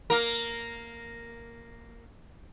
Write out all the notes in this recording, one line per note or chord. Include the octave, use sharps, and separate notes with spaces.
A#3 A#4